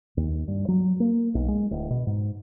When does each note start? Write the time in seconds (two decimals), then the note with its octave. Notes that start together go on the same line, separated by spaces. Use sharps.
0.17 D#2
0.48 G2
0.68 F#3
1.00 A#3
1.35 B1
1.48 G#3
1.71 D1
1.90 B2
2.07 G#2